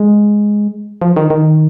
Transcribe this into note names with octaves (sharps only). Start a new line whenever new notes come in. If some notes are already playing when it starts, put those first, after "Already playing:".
Already playing: G#3
F3
D#3
D#3